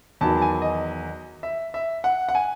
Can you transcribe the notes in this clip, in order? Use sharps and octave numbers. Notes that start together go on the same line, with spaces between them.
E2 D#3 F#3 A5
A5
G#5
D#5
E5
E5
F#5
F#5
G#5